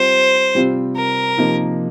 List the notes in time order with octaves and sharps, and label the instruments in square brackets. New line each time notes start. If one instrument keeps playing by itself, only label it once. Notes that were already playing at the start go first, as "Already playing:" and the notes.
Already playing: [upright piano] G3 C4 F4 [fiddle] C5
[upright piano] C3 G3 C4 F4
[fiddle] A#4
[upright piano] C3 F3 A#3 D#4